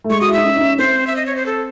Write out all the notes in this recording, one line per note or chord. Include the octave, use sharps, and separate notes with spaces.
A3
G#3 C#6
F#4 D#6
E4
D#4 E5
C#4
D#4
C#4
C4 C5
E5
D#5
C#5
C5
A4